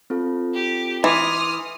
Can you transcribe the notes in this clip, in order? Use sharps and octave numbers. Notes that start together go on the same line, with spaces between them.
C4 F4 A4
G4
E3 C6 D6 D#6 F6 G#6